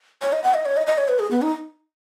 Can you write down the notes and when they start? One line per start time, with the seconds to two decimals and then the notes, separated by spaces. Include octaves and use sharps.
0.22 C#5
0.33 D#5
0.44 F#5
0.54 D#5
0.66 C#5
0.77 D#5
0.87 D#5
0.98 C#5
1.08 B4
1.19 G#4
1.31 B3
1.42 D#4